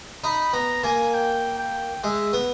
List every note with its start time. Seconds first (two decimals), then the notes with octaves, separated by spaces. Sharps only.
0.24 D#4 B5
0.53 B3 A#5
0.84 A#3 G#5
1.14 G5
1.58 G5
2.03 G#3 E5
2.33 B3